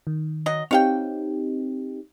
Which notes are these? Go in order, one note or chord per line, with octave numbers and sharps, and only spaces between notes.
D#3
F#3 D#5
C4 D#4 G4 C#5 F5 G5